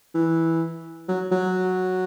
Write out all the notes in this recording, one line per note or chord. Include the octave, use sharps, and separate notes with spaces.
E3
F#3
F#3